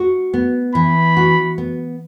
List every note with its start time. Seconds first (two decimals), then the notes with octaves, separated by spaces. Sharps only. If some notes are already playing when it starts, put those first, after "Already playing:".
Already playing: F#4
0.34 B3
0.75 E3 B5
1.17 F#4
1.58 B3